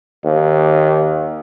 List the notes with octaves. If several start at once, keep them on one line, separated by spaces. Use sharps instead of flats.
D#2